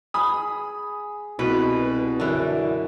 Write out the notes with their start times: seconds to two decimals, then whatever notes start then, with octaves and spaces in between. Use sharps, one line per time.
0.14 G#4 B5 D#6
1.39 C2 B2 B4
2.20 F#2 D3 E3 E4